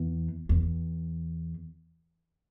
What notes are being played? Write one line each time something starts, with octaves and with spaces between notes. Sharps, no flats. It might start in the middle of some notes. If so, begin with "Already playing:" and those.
Already playing: E2
E2